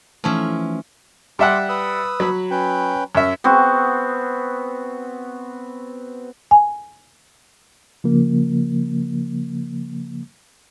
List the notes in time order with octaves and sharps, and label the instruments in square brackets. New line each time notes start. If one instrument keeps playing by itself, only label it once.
[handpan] E3 A3 D#4 [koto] F3 C#4 E5
[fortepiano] G3 E5 F#5 [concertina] C6 D6
[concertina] B4 D#6 E6
[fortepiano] F#3 B5
[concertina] C#4 B4 G5
[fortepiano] F#2 E5
[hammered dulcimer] B3 C4 F#4
[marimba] G#5
[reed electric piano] C#3 F3 A#3